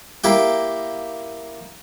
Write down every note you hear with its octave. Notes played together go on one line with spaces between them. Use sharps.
A#3 E4 G4 G5